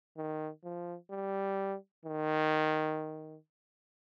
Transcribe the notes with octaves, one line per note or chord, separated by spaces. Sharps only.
D#3
F3
G3
D#3